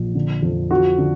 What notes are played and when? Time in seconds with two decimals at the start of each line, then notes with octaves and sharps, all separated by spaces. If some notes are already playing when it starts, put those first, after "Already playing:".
Already playing: A#1
0.15 D3
0.42 F2
0.70 F3 F#4
0.98 D3